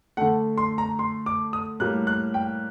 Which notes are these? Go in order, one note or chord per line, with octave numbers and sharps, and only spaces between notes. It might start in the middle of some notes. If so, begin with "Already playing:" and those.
D3 A3 F#5
C6
A#5
C6
D6
D#6
A2 G3 A#3 F#6
F#6
G5